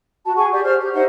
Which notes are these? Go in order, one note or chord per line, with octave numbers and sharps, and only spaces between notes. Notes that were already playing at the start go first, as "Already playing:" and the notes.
F#4 A5
G#4 F#5 G#5 C#6
G4 D5
C5 F6
G4
D#4 C5 E5 F#5